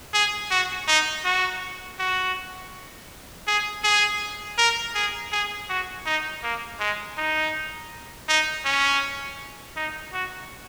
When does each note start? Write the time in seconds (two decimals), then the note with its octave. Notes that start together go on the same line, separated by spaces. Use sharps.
0.13 G#4
0.50 F#4
0.87 D#4
1.25 F#4
1.99 F#4
3.47 G#4
3.84 G#4
4.58 A#4
4.95 G#4
5.32 G#4
5.69 F#4
6.06 D#4
6.43 A#3
6.79 G#3
7.17 D#4
8.28 D#4
8.65 C#4
9.76 D#4
10.13 F#4